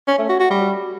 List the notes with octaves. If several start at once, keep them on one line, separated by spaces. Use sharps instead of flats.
C#4
A3
F#4
F#4
G3